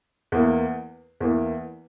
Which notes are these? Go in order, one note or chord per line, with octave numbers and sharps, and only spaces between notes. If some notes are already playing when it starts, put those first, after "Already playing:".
E2 E3 A#3
E2 E3 A#3